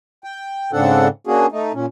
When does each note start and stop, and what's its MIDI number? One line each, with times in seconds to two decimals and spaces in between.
0.24 0.71 79
0.73 1.08 44
0.73 1.08 49
0.73 1.08 60
0.73 1.08 62
0.73 1.08 69
0.73 1.08 78
1.27 1.46 58
1.27 1.46 61
1.27 1.46 62
1.27 1.46 66
1.27 1.46 68
1.52 1.72 57
1.52 1.72 63
1.74 1.86 46
1.74 1.86 61